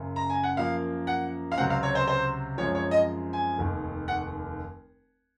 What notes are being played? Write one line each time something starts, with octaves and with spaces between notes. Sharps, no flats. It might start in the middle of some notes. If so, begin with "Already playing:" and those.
Already playing: F#1 F#2 C#3
A#5
G#5
F#5
F#2 F3 A#3 F5
F#5
F5
C#2 C3 F#3 C4 F#5
F5
C#5
C5
C5
F#2 F3 G#3 C4 C#5
C#5
D#5
G#5
F1 D#2 D#3
F#5